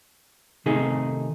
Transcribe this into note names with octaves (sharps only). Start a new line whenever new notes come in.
C3 D#3 A3 D#4 G#4